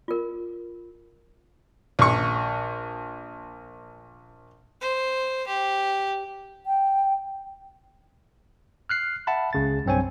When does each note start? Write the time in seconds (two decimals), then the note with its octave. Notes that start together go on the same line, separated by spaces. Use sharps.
0.08 F4 A#4
1.99 A#1 C#6
4.81 C5
5.47 G4
6.66 G5
8.89 F6 F#6 C7
9.27 E5 F#5 A5 B5
9.53 C#2 C#3 A6
9.85 B1 G2 C4 C#5 G#5